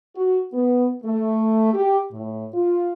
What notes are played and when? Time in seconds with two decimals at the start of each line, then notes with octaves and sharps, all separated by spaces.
0.16 F#4
0.54 B3
1.04 A3
1.74 G4
2.12 A2
2.54 F4